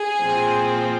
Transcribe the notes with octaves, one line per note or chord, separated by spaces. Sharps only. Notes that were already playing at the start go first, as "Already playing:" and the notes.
Already playing: G#4
A#2 F3 C4